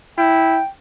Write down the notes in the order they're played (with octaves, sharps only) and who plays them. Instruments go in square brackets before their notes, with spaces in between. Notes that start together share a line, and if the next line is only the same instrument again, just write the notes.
[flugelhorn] E4 [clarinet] G5